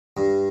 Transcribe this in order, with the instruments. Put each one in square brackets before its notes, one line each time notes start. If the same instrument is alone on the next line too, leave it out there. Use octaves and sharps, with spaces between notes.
[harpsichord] G2